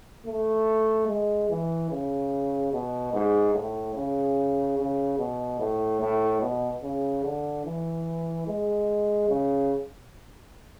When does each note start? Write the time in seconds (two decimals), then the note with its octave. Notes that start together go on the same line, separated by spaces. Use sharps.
0.26 A3
1.08 G#3
1.50 E3
1.91 C#3
2.73 B2
3.13 G#2
3.55 A2
3.95 C#3
4.78 C#3
5.19 B2
5.60 A2
6.01 A2
6.41 B2
6.83 C#3
7.24 D3
7.65 E3
8.47 G#3
9.29 C#3